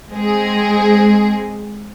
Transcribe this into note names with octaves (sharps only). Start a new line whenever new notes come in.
G#3 C4 G#4